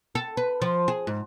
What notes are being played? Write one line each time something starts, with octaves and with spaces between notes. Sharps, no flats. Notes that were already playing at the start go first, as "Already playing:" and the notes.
A4
B4
F3
G#4
G#2